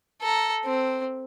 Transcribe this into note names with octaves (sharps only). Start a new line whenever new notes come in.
A4 A#5
C4